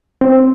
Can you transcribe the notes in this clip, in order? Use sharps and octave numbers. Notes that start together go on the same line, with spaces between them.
C4